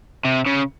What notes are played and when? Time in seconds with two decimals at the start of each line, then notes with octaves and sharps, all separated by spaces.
0.25 C3
0.46 C#3